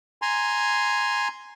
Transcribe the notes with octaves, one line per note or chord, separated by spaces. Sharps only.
G#5 A#5 C6